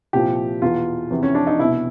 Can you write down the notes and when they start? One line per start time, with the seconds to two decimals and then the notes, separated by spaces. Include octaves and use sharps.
0.13 C2 A#2 F3 G4
0.62 E2 B2 F4
1.10 E2 C3 E3
1.23 C#4
1.35 D4
1.47 D#4
1.59 C2 B2 E4